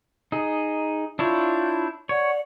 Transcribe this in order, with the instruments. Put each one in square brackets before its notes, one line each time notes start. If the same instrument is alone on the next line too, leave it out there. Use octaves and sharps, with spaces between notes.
[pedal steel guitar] D#4 G#4
[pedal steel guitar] D4 E4 C#5 [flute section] F4 G6
[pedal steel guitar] C#5 [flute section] D5 F#5